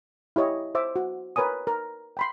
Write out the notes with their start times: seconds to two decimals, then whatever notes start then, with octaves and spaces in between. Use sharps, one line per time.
0.36 E4 G4 C#5 D#5
0.75 C5 E5 D6
0.96 F#4
1.36 A#4 B4 C#5 G#5 D#6
1.67 A#4
2.17 G5 B5 C6